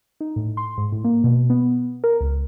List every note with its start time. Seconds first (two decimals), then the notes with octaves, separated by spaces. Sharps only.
0.20 D#4
0.36 A2
0.57 C6
0.78 G#2
0.92 A2
1.04 A#3
1.24 B2
1.50 B3
2.04 A#4
2.21 C#2